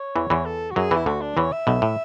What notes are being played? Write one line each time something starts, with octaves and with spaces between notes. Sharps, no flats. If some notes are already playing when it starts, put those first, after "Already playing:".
Already playing: C#5
E2 E3
E2 E3
A4
F#4
F#2 F#3 G#4
E2 E3 E4
D2 D3 F#4
D4
E2 E3 C#5
E5
B1 B2
A2